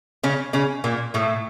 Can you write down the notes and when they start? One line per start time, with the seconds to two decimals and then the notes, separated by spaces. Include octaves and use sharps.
0.23 C#3 C#4
0.53 C#3 C#4
0.84 A#2 A#3
1.14 A2 A3